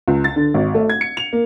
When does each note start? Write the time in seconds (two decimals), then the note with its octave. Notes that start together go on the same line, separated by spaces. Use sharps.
0.08 C#2
0.24 A6
0.36 D3
0.54 G#1
0.75 A3
0.89 G#6
1.01 C#7
1.17 F7
1.33 A#3